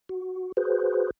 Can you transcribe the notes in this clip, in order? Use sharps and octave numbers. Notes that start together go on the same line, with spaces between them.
F#4
F#4 G#4 B4 C5